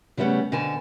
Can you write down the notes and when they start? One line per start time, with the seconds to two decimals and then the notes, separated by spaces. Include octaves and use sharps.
0.17 C#3 G3 A3 B3 C#4
0.52 B2 D3 C5 G#5 A5